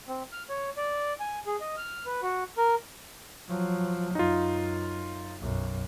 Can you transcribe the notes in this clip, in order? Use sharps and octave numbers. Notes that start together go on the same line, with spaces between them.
C4
F6
C#5
D5
G#5
G#4
D#5
F6
B4
F#4
A#4
F3 F#3
F#2 D#4 F4
B1 F#2